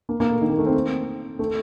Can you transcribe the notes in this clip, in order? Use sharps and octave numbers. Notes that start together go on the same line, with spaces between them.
A#3
A#3
A3
D#3
A#3
A3
C4
A3